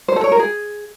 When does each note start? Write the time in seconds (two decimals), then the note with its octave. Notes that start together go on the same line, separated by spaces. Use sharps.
0.08 C5
0.16 A4
0.24 C#5
0.32 A#4
0.39 G#4